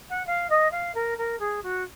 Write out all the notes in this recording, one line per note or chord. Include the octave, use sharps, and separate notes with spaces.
F#5
F5
D#5
F5
A#4
A#4
G#4
F#4